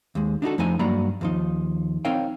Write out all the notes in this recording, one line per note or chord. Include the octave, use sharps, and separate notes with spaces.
D#2 G#3
D4 D#4 F#4 A4
F2 F3 A3 D#4 G#5
G2 F#3 A#3 D5 A#5 B5
D#2 F3 D#4
C4 D#4 A#4 C#5 F5 G5